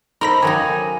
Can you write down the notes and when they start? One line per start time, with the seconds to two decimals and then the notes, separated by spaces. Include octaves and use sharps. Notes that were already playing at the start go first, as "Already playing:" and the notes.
0.21 D#4 A4 A#4 C5 A#5 B5 A#6
0.43 D#3 F#3 D#4 F5 G#5 D6